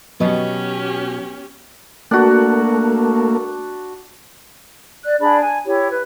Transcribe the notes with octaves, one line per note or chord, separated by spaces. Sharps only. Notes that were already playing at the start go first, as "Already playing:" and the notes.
B2 F#3 B3 C#4 G4 B4 D#5
A3 A#3 D4 F#4
D5 F#6
D4 G#4 D5 B5
G#5
E4 G4 C#5
B4